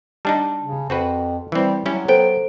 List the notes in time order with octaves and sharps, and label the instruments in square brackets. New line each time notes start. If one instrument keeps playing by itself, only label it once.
[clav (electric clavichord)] G3 D4 D#4 [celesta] A5
[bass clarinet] C#3
[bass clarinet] F2 [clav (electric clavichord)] C4 F#4 B4
[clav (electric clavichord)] E3 C4 [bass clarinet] G3
[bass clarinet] F#3 [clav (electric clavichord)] G3 C#4 E4
[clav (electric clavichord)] B3 G5 [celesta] A4 C5 D7